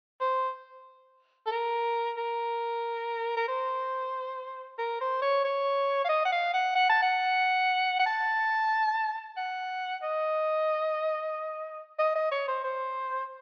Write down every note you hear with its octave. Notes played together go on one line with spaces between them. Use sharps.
C5
A4
A#4
A#4
A#4
C5
A#4
C5
C#5
C#5
F5
D#5
F#5
F5
F#5
F#5
A5
F#5
F#5
A5
F#5
D#5
D#5
D#5
C#5
C5
C5